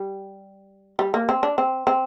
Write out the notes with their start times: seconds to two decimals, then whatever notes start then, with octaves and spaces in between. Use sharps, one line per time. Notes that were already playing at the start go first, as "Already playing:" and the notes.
Already playing: G3
0.99 G3
1.14 A#3
1.29 C4
1.43 D4
1.58 C4
1.87 C4